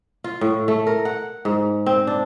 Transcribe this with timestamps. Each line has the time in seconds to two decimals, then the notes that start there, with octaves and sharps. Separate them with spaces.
0.24 F4
0.41 A2
0.68 A3
0.87 A#4
1.05 F#5
1.45 G#2
1.86 C4
2.07 D4